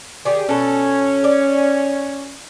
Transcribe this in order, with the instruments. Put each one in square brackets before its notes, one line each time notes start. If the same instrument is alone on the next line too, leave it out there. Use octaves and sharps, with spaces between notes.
[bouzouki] D#3 G#4 D5 [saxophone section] G4
[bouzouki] B2 A4 [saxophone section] C#4
[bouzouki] D5